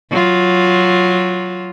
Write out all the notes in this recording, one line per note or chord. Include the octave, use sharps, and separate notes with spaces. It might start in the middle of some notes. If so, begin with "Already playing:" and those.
F#3 F4